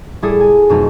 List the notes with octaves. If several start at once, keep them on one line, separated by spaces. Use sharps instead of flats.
A2 G3 E4 G#4 A4 D#6
G#5
F2 B2 F#3 A3 D#4